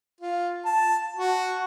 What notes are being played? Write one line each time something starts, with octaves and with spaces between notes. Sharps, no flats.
F4
A5
F#4